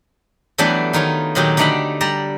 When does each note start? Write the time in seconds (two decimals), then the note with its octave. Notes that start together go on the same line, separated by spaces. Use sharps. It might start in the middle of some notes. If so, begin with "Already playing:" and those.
0.58 E3 F#3 G3 A3 B3 D4
0.93 D#3 D#4 F4 C#5
1.35 A#2 D#3 F#3 D#4 G4
1.57 D3 A3 D4 D#4 G5 B5
2.01 G3 D5 A#5